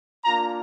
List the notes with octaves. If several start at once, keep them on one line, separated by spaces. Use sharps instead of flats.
A#3 D4 F4 A#5